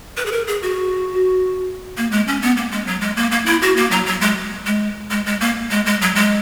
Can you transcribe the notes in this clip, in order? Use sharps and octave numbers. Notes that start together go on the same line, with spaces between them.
B4
G#4
A#4
G#4
F#4
A#3
G#3
C#4
B3
A#3
G#3
F#3
G#3
A#3
A#3
E4
F#4
A#3
F#3
F#3
G#3
G#3
G#3
G#3
A#3
G#3
G#3
F#3
G#3